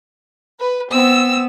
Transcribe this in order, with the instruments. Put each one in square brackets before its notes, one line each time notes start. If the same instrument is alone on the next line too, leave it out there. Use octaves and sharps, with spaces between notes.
[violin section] B4
[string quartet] B3 [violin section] C4 E6